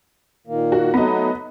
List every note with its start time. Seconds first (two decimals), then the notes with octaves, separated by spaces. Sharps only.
0.47 A#2 D#3 A#3
0.72 F#4
0.94 F#3 A3 B3 D#4 D#5